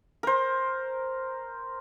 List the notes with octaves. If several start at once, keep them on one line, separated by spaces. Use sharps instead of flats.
A#4 C5